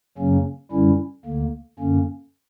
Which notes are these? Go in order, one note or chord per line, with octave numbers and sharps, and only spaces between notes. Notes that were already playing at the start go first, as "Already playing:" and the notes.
F#2 C#3 F#3 A#3 C#4
F#2 D3 G3 C#4 E4
D2 D3 A#3
F#2 D3 A#3 C#4